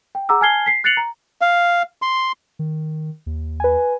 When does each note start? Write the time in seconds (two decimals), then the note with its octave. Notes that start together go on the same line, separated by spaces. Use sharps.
0.15 G5
0.29 G#4 F#5 A#5 D6 E6
0.41 G#5 A5 F6 G#6 C7 G7
0.66 B6 C7
0.84 F#6 A6 C7 C#7 F7 F#7
0.97 A#5
1.41 F5
2.02 C6
2.59 D#3
3.26 D#2
3.60 B4 G#5